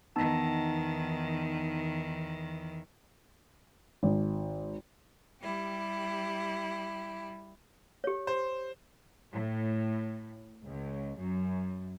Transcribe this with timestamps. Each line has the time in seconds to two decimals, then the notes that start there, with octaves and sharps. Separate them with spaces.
0.16 E2 D#3 B3 D#4 A5
4.03 G#1
5.42 G3 E4 G4
8.04 G4 C#5
8.27 C5
9.32 A2
10.67 C#2
11.19 F#2